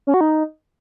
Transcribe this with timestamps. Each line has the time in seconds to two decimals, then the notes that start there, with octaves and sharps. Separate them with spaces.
0.07 C#4
0.14 F#4
0.21 D#4